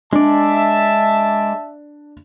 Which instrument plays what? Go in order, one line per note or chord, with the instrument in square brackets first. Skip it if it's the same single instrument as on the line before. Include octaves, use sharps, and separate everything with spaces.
[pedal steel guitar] G#3 D5 [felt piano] D4 [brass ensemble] E5 A5